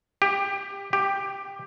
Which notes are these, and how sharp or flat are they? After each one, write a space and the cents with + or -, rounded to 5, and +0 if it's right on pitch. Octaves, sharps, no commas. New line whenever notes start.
G4 +20
G4 +10